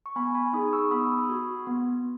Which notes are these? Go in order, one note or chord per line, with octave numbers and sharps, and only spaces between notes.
C#6
B3 G#5 B5
G#5 B5
D#4 G#4 B5 D#6
C#6 E6
B3 B5 D#6
F#4
B3